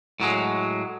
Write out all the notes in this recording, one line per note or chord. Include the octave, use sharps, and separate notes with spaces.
A2 F#3 G#3